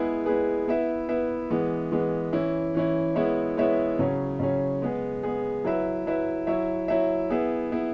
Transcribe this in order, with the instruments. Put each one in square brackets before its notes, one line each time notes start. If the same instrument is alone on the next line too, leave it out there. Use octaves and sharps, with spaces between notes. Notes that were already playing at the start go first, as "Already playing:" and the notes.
Already playing: [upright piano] G#3 B3 E4 G#4 B4
G#3 B3 E4 G#4 B4
B3 E4 B4 E5
B3 E4 B4 E5
E3 G#3 B3
E3 G#3 B3
E3 C#4 E4
E3 C#4 E4
G#3 B3 E4 C#5 E5
G#3 B3 E4 C#5 E5
C#3 F#3 C#4
C#3 F#3 C#4
G#3 B3 G#4
G#3 B3 G#4
F#3 E4 B4 E5
F#3 E4 B4 E5
F#3 E4 C#5 E5
F#3 E4 C#5 E5
B3 E4 G#4 E5
B3 E4 G#4 E5